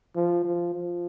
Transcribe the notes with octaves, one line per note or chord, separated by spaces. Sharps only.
F3
F3
F3